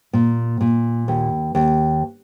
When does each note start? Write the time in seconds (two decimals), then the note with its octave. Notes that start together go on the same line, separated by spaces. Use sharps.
0.13 A#2
0.61 A#2
1.08 D#2
1.55 D#2